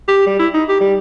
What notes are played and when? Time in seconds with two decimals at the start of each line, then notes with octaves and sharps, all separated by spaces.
0.08 G4
0.27 G3
0.39 E4
0.54 D#4
0.69 G4
0.80 G3